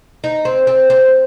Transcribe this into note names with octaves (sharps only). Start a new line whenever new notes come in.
D#4
C4
C4
C4